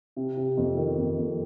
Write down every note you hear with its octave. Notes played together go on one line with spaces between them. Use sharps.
C3
C3
F2
D#3
F2
F2